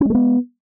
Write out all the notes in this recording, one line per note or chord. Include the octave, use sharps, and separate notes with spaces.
G#3 A3 B3 C#4